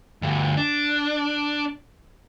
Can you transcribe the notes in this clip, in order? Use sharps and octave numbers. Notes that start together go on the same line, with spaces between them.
D2 G2
D4